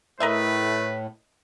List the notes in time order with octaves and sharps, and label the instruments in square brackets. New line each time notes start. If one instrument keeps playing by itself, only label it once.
[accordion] A2 [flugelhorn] A3 [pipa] A#4 D#5 E5 [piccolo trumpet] B4